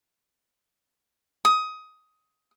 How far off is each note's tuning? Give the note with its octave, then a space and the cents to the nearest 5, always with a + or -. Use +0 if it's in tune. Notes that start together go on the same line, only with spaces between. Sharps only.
D#6 +15